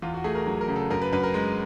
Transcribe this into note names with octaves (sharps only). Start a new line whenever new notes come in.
E2 F4
F#4
A3 G#4
A#4
F#3
A#4
C#3
A4
F#2 A#4
B4
F#2 B4
A#4
G#3